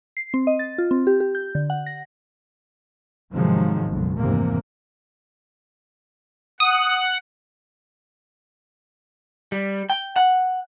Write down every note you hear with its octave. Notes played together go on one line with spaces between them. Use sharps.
C7
C4
D#5
A6
F4
C4
G4
G4
G6
D3
F#5
A#6
G#2 C3 D#3 F3 F#3 G#3
F#1 B1 F#2
F1 D#2 G#2 C3 E3 A#3
F#5 D#6
G3
G5
F#5